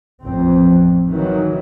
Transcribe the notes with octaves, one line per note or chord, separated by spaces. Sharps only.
A1 F2 C4
D#3 E3 F#3